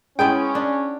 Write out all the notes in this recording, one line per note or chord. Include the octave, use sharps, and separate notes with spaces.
G#3 B3 C#4 E4 G5
D4